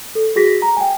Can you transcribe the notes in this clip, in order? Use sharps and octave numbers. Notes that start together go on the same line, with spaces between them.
A4
F#4 G#4 A#6 B6
A#5
G5 G#5